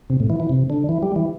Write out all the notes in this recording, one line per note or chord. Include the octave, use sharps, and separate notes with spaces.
C3
A2
E3
E3
C3
D3
E3
G3
E3